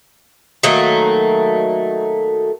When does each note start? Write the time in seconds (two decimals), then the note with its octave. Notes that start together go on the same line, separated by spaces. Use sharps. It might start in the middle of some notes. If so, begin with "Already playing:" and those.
0.63 D#3 F#3 A3 A#3